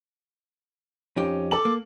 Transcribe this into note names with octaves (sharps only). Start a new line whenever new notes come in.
F2 C#4 D#4 G4
A4 A5 D6 F#7
A#3